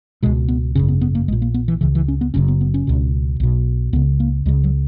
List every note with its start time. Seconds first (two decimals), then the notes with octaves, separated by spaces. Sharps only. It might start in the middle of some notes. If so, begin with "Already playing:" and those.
0.23 C#2 B2 G#3
0.48 B3
0.75 G#1 F#2 C#3 C#4
0.88 B3
1.01 B3
1.15 A#3
1.28 A#1 G#3
1.32 A#2
1.42 A#3
1.54 B3
1.68 E3
1.81 C#2 C#3 E3
1.95 E3
2.08 C#4
2.21 B3
2.34 F#1 F#2 C#3 C#4
2.48 B3
2.61 B3
2.74 C#4
2.87 C#2 B2
3.40 B1 B2
3.93 C#2 C#3 B3
4.20 A#3
4.46 C#2 C#3 G#3
4.64 F#3